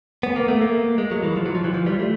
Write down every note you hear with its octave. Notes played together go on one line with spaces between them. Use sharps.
B3
A#3
A3
A#3
G#3
F#3
E3
F3
F#3
F3
E3
F3
G3
A3